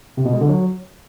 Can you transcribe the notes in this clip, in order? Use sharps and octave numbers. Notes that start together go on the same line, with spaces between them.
C3
B2
G#3
D3
F#3